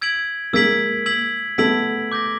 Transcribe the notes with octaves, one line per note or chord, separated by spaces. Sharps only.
E6 G#6 B6 D7 F#7
G#3 A#3 E6 G#6 B6 D7 F#7
E6 G#6 B6 D7 F#7
A3 B3 E6 G#6 B6 D7 F#7
D6 G6 A#6 D7